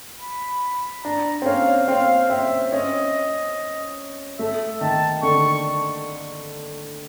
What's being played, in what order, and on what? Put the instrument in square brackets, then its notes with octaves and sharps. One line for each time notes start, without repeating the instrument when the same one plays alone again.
[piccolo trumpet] B5
[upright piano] D4 [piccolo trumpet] A#5
[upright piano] C4
[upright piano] C#4 [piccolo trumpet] F5
[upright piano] C4 [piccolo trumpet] F5
[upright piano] C4 [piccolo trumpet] E5
[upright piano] C#4 [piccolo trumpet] D#5
[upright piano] A3 [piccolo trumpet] E5
[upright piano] D#3 [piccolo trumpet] A5
[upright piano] D3 [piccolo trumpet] C#6